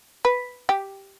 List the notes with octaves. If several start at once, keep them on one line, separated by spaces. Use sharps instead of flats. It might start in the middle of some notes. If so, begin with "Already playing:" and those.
B4
G4